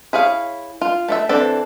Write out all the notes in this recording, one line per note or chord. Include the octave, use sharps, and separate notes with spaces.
E4 G#4 C#5 F5
F4
A3 D5 E5
E3 C4 D4 A4 D5